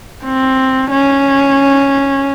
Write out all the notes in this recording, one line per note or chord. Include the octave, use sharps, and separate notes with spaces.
C4
C#4